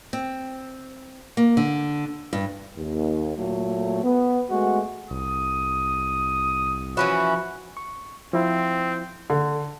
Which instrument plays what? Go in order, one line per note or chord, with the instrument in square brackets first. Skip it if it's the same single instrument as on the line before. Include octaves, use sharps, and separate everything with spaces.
[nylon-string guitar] C4
A#3
D3
G2
[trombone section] D#2
A#2 F#3 A3
B3
G#3 A3 B3 F#4
[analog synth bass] C2 [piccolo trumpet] D#6
[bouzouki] E3 C#4 E4 [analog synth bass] F3 [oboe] F#4
[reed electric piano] C#6
[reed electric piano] F3 E4 F4 [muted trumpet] C4
[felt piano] D3